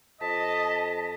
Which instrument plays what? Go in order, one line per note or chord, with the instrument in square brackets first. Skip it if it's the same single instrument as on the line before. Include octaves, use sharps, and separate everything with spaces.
[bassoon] F2 [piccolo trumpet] D#5 [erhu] A5 [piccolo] B6